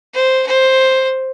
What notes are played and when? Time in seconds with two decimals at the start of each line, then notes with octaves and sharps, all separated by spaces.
0.14 C5
0.47 C5